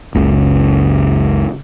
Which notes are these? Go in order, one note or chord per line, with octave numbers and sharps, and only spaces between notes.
F#1 C#2 C#3